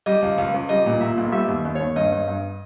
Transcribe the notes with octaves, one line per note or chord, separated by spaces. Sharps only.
G3 D#5
C#2
C#2
C#2
G3 D#5
A#2
A#2 E5
B1
G3 E5
D#2
D#2
D#2 C#5
G2 D#5
G2
G2